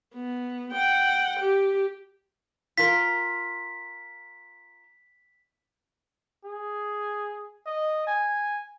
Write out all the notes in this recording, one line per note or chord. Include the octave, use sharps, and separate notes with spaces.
B3
F#5 G5
G4
F4 A#4 B6
G#4
D#5
G#5